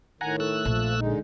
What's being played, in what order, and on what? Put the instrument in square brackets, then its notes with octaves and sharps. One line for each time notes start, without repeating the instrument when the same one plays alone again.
[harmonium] A2 D#3 [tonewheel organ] F#5 G#5 A#5
[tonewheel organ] A3 E6 F#6
[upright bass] A#1 [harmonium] F3
[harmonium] D3 G#3 D#4